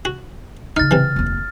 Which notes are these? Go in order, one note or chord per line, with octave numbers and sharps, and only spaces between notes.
F#4
D#2 C#3 D#4 F6 A6
C3 E3
F1 D#2